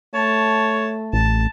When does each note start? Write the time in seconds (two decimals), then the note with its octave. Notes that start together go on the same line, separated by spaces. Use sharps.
0.14 A3 C#5 A5
1.13 A1 A5